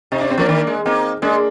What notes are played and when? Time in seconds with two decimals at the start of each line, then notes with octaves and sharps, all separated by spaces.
0.12 C3 D#4
0.21 D4
0.30 C4
0.38 F3 A#3 D4
0.49 D#3
0.67 G#3
0.86 A#3 C4 D#4
1.22 G#3 A#3 D4